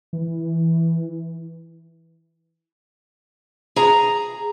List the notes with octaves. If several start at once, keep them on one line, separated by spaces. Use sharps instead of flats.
E3
G#4 A#5